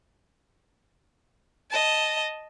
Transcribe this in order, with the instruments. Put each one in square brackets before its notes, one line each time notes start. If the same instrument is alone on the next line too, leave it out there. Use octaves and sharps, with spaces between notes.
[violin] D#5 A5